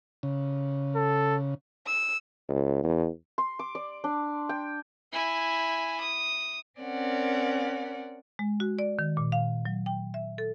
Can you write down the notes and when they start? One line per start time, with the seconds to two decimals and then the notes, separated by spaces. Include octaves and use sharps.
0.23 C#3
0.96 A4
1.86 E6
2.49 C#2
2.84 E2
3.38 C6
3.59 D6
3.75 D5
4.04 D4
4.49 G5
5.12 E4 G#5
6.00 D#6
6.80 C4 C#4 A#4 D5 F#5
8.39 G#3
8.60 F#4
8.79 D5
8.99 D#3
9.17 A#2
9.32 F5
9.65 F#3
9.86 G5
10.14 E5
10.38 A4